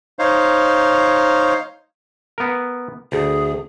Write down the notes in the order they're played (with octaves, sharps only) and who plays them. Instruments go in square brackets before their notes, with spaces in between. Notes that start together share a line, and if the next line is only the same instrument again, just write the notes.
[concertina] D#4 C5 C#5 F5
[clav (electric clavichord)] B3 A#4
[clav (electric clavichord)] D2 [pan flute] G#4